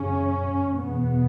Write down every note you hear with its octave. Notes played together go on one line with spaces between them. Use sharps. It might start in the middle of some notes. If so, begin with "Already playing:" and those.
Already playing: F#2 C#3 C#4
E2 B2 B3